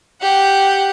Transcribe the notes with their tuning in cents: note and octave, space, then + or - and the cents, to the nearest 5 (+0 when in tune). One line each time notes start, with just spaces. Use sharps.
G4 +0 F#5 +0